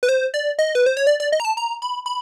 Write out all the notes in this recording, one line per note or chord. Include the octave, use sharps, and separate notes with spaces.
B4
C5
D5
D#5
B4
C5
C#5
D5
D5
D#5
A#5
A5
A#5
B5
B5